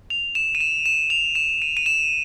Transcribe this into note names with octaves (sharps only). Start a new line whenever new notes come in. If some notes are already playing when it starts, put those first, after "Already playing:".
F7
E7
D#7
E7
E7
F7
E7
D#7
D#7
E7